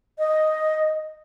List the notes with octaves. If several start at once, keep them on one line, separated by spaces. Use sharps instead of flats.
D#5